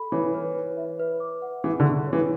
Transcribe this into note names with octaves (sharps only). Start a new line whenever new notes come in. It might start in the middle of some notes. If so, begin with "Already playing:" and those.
Already playing: A4 B5
E3 C#5
B4
B4
E5
B4
D6
F#5
E3 G#4
D3
C#6
C#5
E3